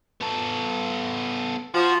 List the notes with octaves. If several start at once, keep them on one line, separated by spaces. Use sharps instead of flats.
B3 A4
F3 F#4